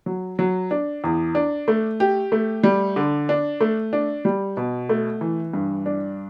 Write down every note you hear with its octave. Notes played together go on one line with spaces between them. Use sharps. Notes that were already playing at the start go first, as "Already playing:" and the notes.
F#3
F#3
D4
E2
D4
A3
G4
A3
G3
D3
D4
A3
D4
G3
B2
A3
E3
G2
D4